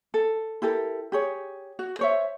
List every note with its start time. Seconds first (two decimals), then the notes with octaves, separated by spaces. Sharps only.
0.14 A4
0.62 E4 G4 A4 A#4
1.12 G4 G#4 C#5
1.79 F#4
1.99 C5 C#5 E5